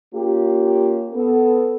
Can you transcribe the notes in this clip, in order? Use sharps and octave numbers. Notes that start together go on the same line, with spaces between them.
A#3 C#4 F4 G4
B3 A4